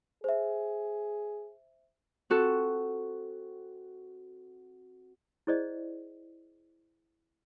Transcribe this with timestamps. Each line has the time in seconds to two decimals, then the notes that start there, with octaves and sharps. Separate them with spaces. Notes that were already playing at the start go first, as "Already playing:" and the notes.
0.24 G#4 C5 E5
2.30 C4 F#4 A4
5.47 E4 G#4 C5 D5 D#5